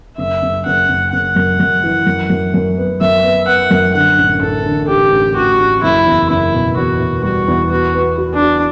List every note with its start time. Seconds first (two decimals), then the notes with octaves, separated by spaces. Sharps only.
0.18 F#1 E5
0.42 F#1
0.66 F#1 F#5
0.89 F#1
1.13 F#1 F#5
1.36 F#2
1.60 F#2
1.84 E3
2.07 F#2
2.30 F#2
2.54 F#2
2.78 B3
3.01 F#2 E5
3.23 B3
3.47 B3 F#5
3.71 F#2
3.95 D3 F#5
4.18 A1
4.42 A1 A4
4.66 D3
4.88 A1 G4
5.12 A1
5.36 A1 F#4
5.60 A1
5.83 F#1 E4
6.06 E2
6.29 F#1 E4
6.54 B2
6.77 E2 F#4
7.00 B2
7.23 G3 F#4
7.48 E2
7.71 B3 F#4
7.94 B3
8.18 F#4
8.34 D4
8.42 F#4